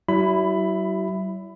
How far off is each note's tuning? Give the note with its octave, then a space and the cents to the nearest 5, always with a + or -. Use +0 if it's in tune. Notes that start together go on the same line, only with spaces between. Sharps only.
F#3 +45 E4 +0 B5 +20